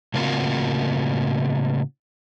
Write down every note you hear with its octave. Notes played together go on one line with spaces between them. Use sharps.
A2 C#3 A#3 C4 F4 F#4